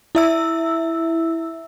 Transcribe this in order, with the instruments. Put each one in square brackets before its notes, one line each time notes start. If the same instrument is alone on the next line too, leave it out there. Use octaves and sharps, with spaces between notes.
[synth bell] E4 E5 E6